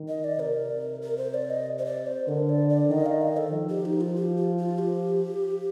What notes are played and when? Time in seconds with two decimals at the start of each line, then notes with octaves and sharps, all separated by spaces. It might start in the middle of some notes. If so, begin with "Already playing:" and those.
Already playing: D#3
0.09 D#5
0.24 D5
0.39 C3 A#4
1.02 A#4
1.17 C5
1.34 D5
1.50 D#5
1.79 C5
1.86 D5
2.06 C5
2.28 D3 A#4
2.49 D5
2.69 D5
2.90 D#3 D#5
3.06 F5
3.22 D#5
3.37 A4
3.53 F3
3.69 G4
3.85 D#4
4.01 F4
4.16 G4
4.37 F4
4.58 F4
4.78 G4